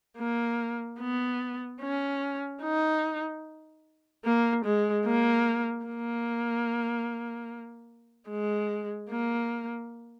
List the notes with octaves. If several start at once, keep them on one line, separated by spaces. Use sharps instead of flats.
A#3
B3
C#4
D#4
A#3
G#3
A#3
A#3
G#3
A#3